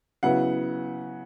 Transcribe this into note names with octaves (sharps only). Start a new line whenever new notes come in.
C#3 F#3 B3 E4 F#5